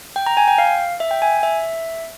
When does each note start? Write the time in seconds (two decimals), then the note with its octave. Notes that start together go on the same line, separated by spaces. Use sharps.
0.16 G5
0.26 A#5
0.37 G#5
0.48 G5
0.58 F5
1.00 E5
1.11 G5
1.22 G#5
1.43 E5